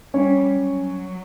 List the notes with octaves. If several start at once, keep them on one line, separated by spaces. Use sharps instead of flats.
G3 C#4 C#5
F#3